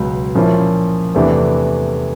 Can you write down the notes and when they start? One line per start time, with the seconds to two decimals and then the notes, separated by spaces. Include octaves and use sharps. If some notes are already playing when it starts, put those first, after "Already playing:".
Already playing: C#2 B2 F#3
0.35 A#2 F3 A#3 C#4 E4
1.15 E2 C3 E3 A3 D4